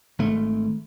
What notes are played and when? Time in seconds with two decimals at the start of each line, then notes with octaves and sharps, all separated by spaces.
0.19 G#1 A3